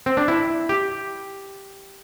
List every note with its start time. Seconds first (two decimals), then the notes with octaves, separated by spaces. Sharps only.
0.06 C4
0.17 D4
0.28 E4
0.69 G4